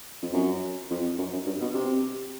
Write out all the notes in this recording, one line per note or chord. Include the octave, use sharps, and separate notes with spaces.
F2
F#2
F2
F#2
F#2
G2
B2
C3